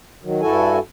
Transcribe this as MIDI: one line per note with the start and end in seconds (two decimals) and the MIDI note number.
0.23 0.41 51
0.23 0.41 54
0.42 0.79 43
0.42 0.79 64
0.42 0.79 66
0.42 0.79 69
0.42 0.79 80